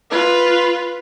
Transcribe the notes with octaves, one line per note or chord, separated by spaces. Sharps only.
F4 B4